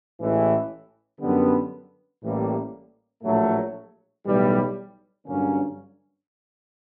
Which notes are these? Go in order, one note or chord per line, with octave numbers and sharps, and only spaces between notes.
A1 A2 E3 G#3
F#2 D3 G3 B3
A1 A2 E3 G3 A#3
A#1 A2 F#3 A3
B1 A2 E3 G3
G2 D3 F#3 A#3 C#4